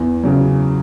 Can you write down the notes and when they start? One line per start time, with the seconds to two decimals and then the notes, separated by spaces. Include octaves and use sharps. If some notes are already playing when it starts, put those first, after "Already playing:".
Already playing: E2
0.24 C#3 F#3